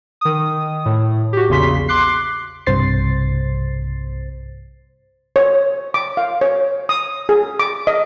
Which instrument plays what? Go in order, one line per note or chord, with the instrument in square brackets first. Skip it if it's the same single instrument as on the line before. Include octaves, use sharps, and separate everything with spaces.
[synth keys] D#3 D#6
A2
F#4 G4
A#1 E2 C#3 C6 B6
C6 D6 F#6 C7
[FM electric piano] B1 G2 C3 C5 A6 C7
[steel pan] C#5
D6
F5
C#5
D#6
G#4
D6
D#5